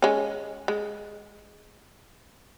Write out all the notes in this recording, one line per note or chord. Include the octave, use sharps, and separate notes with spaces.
G#3 C#4
G#3